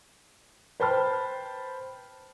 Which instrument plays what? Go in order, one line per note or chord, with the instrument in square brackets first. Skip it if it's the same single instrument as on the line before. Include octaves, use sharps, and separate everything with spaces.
[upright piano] B4 C5 G5 A5 B5 F6